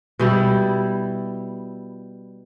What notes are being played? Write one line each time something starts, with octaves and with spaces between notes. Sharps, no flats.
B2 G3 E4